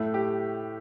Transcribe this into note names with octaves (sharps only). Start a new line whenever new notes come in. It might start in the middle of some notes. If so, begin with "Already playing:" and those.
Already playing: A2 A3
G4